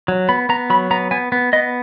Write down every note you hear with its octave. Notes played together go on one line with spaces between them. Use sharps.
F#3
B3 B5
B3 A#5
F#3 B5
B3 A#5
B3 G#5
B3
B3 D#5